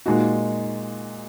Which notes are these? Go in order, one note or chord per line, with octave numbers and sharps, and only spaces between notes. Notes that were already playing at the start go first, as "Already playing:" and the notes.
A#2 G#3 D#4 F#4